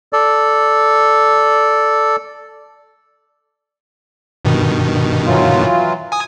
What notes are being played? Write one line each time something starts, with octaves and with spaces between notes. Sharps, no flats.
A4 D5
G2 B2 D#3
E3 F#3 F4
G#5 D#6